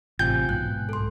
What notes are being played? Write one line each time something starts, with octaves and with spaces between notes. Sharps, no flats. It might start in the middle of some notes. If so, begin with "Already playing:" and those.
A1 C3 F4 G5 G#5 G6
B1 G#2 B2 F#6
A4 C6